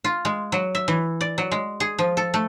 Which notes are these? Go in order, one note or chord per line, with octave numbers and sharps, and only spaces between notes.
F4
G#3
F#3
E5
E3
D5
F#3
G#3
G#4
F3
A4
A3